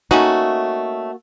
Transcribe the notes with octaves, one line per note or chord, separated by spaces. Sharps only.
A3 A#3 C#4 D#4 F#4